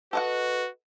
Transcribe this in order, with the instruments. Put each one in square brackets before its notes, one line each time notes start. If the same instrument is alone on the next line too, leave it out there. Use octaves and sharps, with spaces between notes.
[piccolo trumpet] F#4 [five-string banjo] A4 D#5 F#5 [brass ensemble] B4